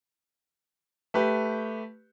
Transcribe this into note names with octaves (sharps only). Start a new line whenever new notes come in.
A3 G4 B4